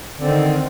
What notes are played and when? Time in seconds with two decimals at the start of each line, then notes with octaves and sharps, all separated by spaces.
0.18 D3
0.21 C4
0.24 D#3